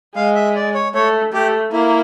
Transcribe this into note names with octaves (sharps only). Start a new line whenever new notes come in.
G#3 F5
E5
D5
C#5
A3 C#5
A3 G4
A#3 E4